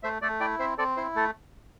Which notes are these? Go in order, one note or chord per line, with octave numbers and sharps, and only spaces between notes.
A3 C5 E5
A3 A4 D5
E4 D5 G5
C4 C5 E5
C4 A4 D5
E4 C5
A3 A4